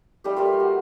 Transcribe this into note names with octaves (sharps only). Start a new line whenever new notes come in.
G3 A3 D#4 G4
G3 A3 A#3 F4
F#4